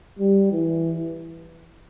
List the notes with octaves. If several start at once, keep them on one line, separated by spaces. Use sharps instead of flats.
G3
E3